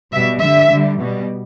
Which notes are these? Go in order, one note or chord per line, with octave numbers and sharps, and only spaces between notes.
B2 G3 E5
D3 G3 E5
D3 G3
B2 G3